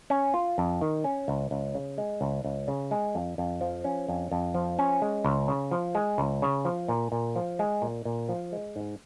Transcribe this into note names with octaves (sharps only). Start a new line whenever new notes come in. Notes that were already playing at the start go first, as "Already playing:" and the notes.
C#4
F4
F2
D#3
C#4
C#2
C#2
C#3
G#3
C#2
C#2
C#3
G#3
F2
F2
F3
C#4
F2
F2
F3
C#4
G#3
C#2
C#3
F3
G#3
C#2
C#3
F3
A#2
A#2
F3
G#3
A#2
A#2
F3
G#3
G#2